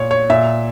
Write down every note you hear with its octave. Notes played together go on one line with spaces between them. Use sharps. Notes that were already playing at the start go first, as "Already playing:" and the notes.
Already playing: A#2 C#5
C#5
A#2 E5